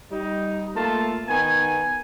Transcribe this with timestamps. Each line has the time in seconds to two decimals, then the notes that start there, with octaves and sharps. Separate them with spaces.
0.12 G3 D#4
0.76 A3 A#3 F4 A4 A5
1.28 D#3 B3 G#5